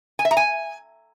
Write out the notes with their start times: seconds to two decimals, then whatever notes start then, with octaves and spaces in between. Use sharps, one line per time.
0.19 G#5
0.25 E5
0.31 A#5
0.37 G#5